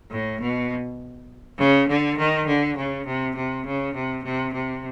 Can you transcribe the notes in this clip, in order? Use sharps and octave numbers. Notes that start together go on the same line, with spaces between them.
A2
B2
C#3
D3
D#3
D3
C#3
C3
C3
C#3
C3
C3
C3